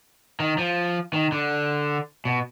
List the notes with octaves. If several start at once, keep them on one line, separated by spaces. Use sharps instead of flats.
D#3
F3
D#3
D3
B2